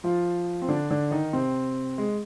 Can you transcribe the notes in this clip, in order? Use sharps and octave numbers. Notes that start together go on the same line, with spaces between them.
F3 F4
C4
D3 D4
D3 D4
D#3 D#4
C3 C4
G#3